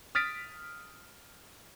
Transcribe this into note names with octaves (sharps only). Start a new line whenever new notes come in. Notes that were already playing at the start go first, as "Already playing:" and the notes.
D#6 F6 A6 B6 D7